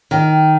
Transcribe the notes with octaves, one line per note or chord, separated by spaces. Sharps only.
D#3